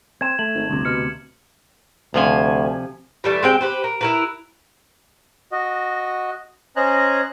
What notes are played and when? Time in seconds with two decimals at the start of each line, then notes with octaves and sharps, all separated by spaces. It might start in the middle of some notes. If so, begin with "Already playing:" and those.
0.21 C4 G#6 E7
0.39 A3 F#7
0.54 G#1
0.70 G1 D2 C3
0.85 B2 F6 C#7
2.14 D2 C3 F3 G#5
3.24 E3 G3 A3
3.43 G#3 C4 G5
3.61 G4 B4 C5
3.84 A#4
4.01 E4 A#4 B4
5.52 F#4 D#5
6.76 C#4 C5 D#5 G#5 A#5 F#6